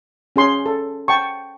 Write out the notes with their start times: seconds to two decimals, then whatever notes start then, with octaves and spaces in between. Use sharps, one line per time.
0.36 C#4 G#4 C6
0.66 A4
1.08 G5 A5 C#6